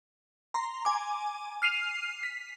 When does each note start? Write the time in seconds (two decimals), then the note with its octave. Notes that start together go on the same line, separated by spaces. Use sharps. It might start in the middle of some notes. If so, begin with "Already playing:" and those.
0.54 A#5 C6
0.85 G#5 D6
1.62 F6 C7 D#7 F7
2.23 B6